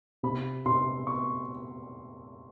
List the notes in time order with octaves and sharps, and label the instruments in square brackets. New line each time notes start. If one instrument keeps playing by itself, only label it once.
[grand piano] C3 B5
C3 C6
C#6